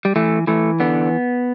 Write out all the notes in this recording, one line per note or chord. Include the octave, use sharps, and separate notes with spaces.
G3
E3 A3
E3 A3
D3 B3